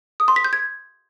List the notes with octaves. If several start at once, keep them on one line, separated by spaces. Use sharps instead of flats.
D#6
C6
B6
G6
G#6